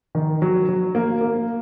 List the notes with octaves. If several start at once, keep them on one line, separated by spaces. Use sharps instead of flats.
D#3
F#3
F#3
A#3
A#3